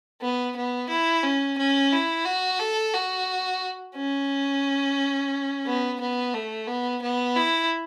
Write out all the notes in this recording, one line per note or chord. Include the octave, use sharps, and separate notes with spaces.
B3
B3
E4
C#4
C#4
E4
F#4
A4
F#4
C#4
B3
B3
A3
B3
B3
E4